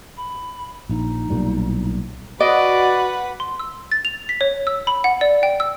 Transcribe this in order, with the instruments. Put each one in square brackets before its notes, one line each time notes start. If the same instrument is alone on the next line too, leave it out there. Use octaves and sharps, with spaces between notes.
[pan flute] B5
[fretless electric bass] A#1 [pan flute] D#4
[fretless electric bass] B1 A#2 G3
[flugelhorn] F#4 [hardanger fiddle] B4 F#5 [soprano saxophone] D5 [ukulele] D#5
[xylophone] C6
E6
A6
F7
B6
C#5
E6
B5
F#5
D5
G5
E6